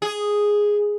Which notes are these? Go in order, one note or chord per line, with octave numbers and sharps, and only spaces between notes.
G#4